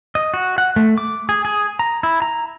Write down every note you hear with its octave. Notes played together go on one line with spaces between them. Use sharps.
D#5
F#4
F#5
A3
D6
G#4
G#4
A#5
E4
A#5